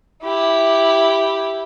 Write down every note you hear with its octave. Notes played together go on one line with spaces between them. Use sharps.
E4 G4